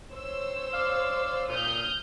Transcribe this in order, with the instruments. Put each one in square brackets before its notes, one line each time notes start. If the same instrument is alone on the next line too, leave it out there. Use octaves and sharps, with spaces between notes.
[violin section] C5 C#5 E6
[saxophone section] D5 F5
[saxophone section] A#2 [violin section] D#6 F6 G6